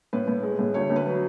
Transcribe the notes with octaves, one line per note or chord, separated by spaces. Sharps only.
A2 B4
A2
G#3
A2
D2 C#5
D2
B4
F#3